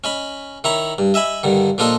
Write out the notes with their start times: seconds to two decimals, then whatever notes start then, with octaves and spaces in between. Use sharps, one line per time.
0.04 C#4 D#5 B5
0.64 D#3 E4 C#5 A#5 B5
0.98 G2
1.14 D#5 E5 G#5 B5
1.43 G2 D3 D#3
1.78 A#2 F3 D4 F4 A4 D#5